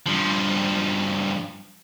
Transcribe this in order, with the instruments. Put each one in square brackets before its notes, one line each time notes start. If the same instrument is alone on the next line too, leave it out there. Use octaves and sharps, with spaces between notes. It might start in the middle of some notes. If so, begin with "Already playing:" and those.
[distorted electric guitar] G2 F3